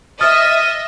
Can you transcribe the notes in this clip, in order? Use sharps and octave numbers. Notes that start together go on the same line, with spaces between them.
D#5 E5 D#6 F6 A6